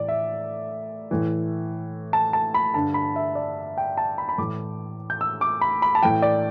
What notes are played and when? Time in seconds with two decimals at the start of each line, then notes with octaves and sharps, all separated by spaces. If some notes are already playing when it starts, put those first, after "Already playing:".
Already playing: A2 E3 D5
0.08 E5
1.11 A2 E3
2.13 A5
2.33 A5
2.54 B5
2.74 G2 D3 A5
2.94 B5
3.16 E5
3.35 D5
3.78 G5
3.97 A5
4.18 B5
4.29 B5
4.38 A2 E3 D6
5.10 G6
5.21 E6
5.41 D6
5.61 B5
5.82 B5
5.95 A5
6.02 A2 E3 G5
6.22 D5